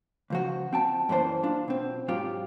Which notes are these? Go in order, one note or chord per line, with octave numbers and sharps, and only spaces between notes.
C#2 F3 F#4
C4 G5 A5
F#2 A#2 E3 C5 A5
D4 F4
B2 C4
G#2 F#3 C4 F4 G4